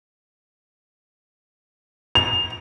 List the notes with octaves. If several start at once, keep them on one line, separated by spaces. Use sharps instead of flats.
F7